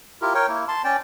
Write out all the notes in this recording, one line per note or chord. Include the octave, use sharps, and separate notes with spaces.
E4 F4 G4 A#4
A#4 C#5 G5
A#3 E4
A5 C6
C#4 D5 G5